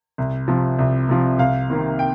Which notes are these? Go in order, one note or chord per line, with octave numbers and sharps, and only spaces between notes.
C2
C3 F3
C2
C3 F3
C2 F5
C3 D#3 A#3
G5